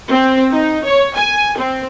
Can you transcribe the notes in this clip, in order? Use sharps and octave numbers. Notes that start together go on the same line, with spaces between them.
C4
D#4
C#5
G#5
C4